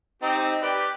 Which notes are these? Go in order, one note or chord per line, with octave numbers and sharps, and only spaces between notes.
C4 D#4 G4
G4 B4 D5